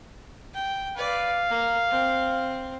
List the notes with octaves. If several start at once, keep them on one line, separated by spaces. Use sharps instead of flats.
G5
B4 D5 F5
A#3
C4